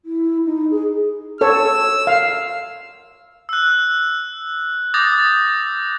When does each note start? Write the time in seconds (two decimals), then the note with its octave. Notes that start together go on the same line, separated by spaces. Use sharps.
0.05 E4
0.46 D#4
0.71 G#4
1.41 A4 C#5 E6
2.07 F5
3.49 E6 F#6
4.94 D6 D#6 G6 A6 A#6